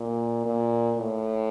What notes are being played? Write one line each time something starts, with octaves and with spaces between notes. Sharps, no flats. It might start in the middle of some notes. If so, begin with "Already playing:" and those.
Already playing: A#2
A#2
A2